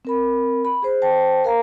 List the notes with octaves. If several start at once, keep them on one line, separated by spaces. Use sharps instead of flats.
C4 A#4 B5
B5
G#4 C5
C5 G5 A5
A#4 F5 A#5